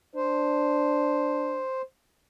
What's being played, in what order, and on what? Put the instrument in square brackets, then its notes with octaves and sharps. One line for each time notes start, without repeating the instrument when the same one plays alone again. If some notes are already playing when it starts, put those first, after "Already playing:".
[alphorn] D4 [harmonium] C5